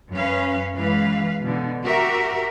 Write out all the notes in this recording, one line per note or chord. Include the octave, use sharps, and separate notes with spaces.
F#2 C#4 B4 F5
F#2 E3 G#3 B4 F5
B2 D3 E3
F#4 G4 A#4 E5